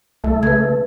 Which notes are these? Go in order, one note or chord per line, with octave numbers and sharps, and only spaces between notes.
C2 A3
C#3 B4 G#6